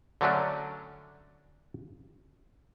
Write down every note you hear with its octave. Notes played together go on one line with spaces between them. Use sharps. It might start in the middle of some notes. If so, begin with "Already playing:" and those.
D3 F#3 A3 C#4 D4